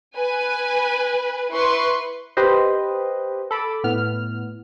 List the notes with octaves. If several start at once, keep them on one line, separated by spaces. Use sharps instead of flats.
B4 G#5
E4 B4 C6 C#6
G4 B4 C5 D#5
A4 B5 D6
A2 B3 F6